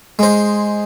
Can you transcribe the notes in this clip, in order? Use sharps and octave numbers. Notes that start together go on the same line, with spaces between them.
G#3 C5